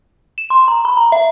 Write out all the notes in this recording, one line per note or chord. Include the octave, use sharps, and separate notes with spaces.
E7
C6
A#5
B5
A#5
E5